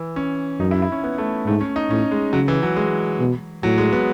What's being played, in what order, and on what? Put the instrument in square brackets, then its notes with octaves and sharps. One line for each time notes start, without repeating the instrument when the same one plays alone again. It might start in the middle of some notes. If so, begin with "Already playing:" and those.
Already playing: [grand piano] E3
C#4
[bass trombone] F#2 [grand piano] D#4
[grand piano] E4
E4
C#4
B3
A3
[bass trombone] G#2 [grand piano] A3
[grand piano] C#4
D#4
[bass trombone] A2 [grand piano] C#4
[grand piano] G#3
[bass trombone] C#3 [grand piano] F#3
[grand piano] E3
F#3
G#3
[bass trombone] B2
[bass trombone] A2 [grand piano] F#3
[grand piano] G#3
B3